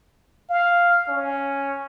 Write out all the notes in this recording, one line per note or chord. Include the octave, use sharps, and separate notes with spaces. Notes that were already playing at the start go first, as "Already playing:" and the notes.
F5
C#4